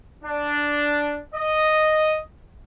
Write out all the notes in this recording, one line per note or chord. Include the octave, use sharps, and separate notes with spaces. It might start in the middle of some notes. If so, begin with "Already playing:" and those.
D4
D#5